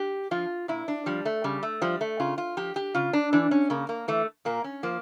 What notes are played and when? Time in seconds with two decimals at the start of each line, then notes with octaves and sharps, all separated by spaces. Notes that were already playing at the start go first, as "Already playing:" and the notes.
Already playing: G4
0.31 F3 F4
0.68 A#2 E4
0.88 D4
1.06 F3 G3
1.25 A3
1.44 C#3 G3
1.63 A3
1.82 F3 G3
2.01 A3
2.20 C#3 F4
2.38 F4
2.57 F3 G4
2.76 G4
2.95 C#3 F4
3.13 D4
3.33 E3 D4
3.51 C#4
3.70 C#3 A#3
3.89 A#3
4.08 E3 A3
4.45 A#2 A#3
4.64 C#4
4.83 F3 A#3